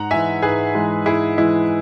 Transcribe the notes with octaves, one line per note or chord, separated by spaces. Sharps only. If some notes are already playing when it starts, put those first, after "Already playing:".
Already playing: G#2 F#5 A#5
E3 G#3 E5 G#5
G#2 G#4 B4
E3 G#3
G#2 E4 G#4
E3 G#3 E4